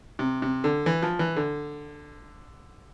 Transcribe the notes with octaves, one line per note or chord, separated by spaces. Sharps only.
C3
C3
D3
E3
F3
E3
D3